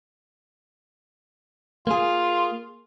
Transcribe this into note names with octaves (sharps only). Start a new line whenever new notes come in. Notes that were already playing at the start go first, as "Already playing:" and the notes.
A#3 F4 G#4